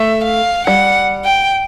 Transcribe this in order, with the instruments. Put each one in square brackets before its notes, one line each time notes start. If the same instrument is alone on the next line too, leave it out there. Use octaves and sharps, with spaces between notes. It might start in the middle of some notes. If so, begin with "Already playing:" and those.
Already playing: [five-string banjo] A3 [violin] E5
[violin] F5
[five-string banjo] G3 [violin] F#5
[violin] G5